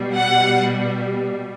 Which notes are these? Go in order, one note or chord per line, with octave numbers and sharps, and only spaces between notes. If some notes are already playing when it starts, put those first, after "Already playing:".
Already playing: B2 G3
F#5